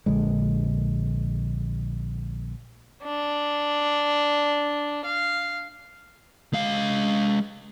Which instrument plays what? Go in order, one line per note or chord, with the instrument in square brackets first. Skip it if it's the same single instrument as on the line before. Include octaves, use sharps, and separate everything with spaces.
[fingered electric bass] A#1 D3 G#3
[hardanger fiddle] D4
F5
[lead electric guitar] G#3 F5